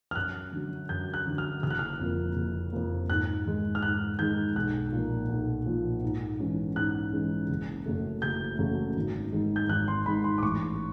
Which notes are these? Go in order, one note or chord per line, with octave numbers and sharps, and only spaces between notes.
F6
F#2 F#6
D3 F#3
F#2 G6
F#6
D3 F#3
F6
F#1 F6
F#6
F6
F2 C3 F3 A#3
F#1
F2 C3 F3 A#3
G#2 F#6
D#3 G#3
F6
G#2 F#6
D#3 G#3 G6
B1 F#6
A#2 F3 A#3
B1
A#2 F3 A#3
G#2
E3 G#3 C#4
G#2 F#6
E3 G#3 C#4
F#1
F#2 C#3 F#3 A3
F#1 G6
F#2 C#3 F#3 A3
G#1
G#2 D#3 G#3
G6
G#1 F#6
C6
G#2 D#3 G#3 B5
C6
D6
A1 C#6